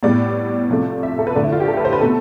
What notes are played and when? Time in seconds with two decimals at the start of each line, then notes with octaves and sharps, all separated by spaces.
0.03 A2 G3 B3 D5
0.69 C3 F3 A3
1.03 E5
1.19 A4
1.27 B4
1.35 D3 A3 D5
1.44 E4
1.52 F4
1.60 G4
1.68 A4
1.77 B4
1.85 C5
1.93 B4
2.01 B2 A3 A4